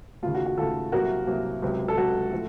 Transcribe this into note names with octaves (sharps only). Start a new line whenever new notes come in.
D#2 C#3 A3 F4
F#4
F#4
D#2 C#3 A3 F4 A4
C2 C3 F#3 A#3 F#4 A#4
C2 C3 F#3 A#3
C#2 C3 F#3
A4
C#2 C3 F#3 F#4
A2 F3